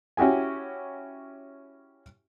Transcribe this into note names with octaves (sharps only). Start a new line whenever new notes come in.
C#4 E4 F#4 G4 G#5